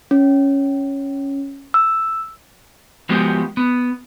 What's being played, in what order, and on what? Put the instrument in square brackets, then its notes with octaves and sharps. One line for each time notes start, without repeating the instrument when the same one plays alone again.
[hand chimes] C#4
E6
[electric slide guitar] F3 G#3 B3 F#4 G4
B3